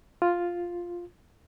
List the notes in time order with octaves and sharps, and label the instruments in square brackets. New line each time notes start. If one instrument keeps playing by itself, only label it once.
[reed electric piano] F4